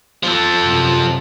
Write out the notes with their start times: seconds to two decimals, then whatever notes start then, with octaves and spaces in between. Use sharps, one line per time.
0.23 F3 A4
0.62 F#2 C3